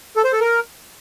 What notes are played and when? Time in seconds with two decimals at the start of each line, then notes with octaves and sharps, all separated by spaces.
0.16 A4
0.24 C5
0.32 A4
0.41 A#4